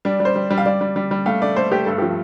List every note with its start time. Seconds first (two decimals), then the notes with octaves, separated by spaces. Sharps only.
0.05 G3 D4
0.20 G3
0.25 C5
0.36 G3
0.50 G3
0.58 F5
0.66 G3 D5
0.81 G3
0.96 G3
1.11 G3
1.26 A3 F5
1.41 A3 D5
1.56 A3 C5
1.72 A3 G4
1.85 G2 A4
1.98 F3 G4